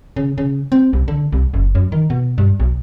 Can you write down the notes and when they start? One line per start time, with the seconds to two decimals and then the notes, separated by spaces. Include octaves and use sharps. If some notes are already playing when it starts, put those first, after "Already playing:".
0.16 C#3
0.38 C#3
0.72 C4
0.93 C2
1.08 D3
1.32 C2
1.54 F#1
1.75 F#2
1.92 D#3
2.10 B2
2.38 G2
2.60 B1